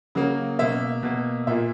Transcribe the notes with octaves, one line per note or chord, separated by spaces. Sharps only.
C#3 F#3 A#3
B2 A#3 E5
B2 A#3
A#2 A#3 E5